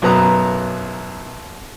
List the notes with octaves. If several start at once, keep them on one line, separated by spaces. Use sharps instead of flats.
B1 F#2 B4 A#5 D#6